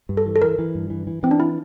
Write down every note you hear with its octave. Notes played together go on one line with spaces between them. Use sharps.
G2
A4
E3
A4
E3 A#4
E3
G2
E3
E3
E3 C4
D4
E4